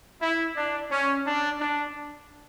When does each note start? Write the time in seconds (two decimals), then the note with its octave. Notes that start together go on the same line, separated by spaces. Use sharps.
0.21 E4
0.56 D4
0.90 C#4
1.25 D4
1.60 D4